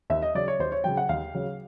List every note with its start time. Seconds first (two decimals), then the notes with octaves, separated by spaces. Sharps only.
0.10 D#2 E5
0.22 D#5
0.35 C#3 F#3 D5
0.48 C#5
0.59 D#2 C5
0.72 C#5
0.84 C#3 F#3 G5
0.97 F#5
1.09 D#2 F5
1.35 C#3 F#3